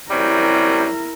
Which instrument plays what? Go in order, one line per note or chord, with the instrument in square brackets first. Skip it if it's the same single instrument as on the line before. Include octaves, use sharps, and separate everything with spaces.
[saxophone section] F#2 C3 G3 [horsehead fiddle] E4 A#4